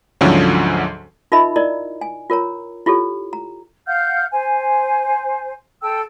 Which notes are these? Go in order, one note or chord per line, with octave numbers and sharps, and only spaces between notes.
D2 G#2 D3 F3 F#3 C#4
D#4 F4 A#4 D#5 E5 B5
E4 A#4 D5 D#5 A#5
G#5
F4 A#4 C#5 A#5
E4 F4 G4 A4 C#5
A#5
F5 F#5 F6 G6
C5 G#5
A4 G5 A5 E6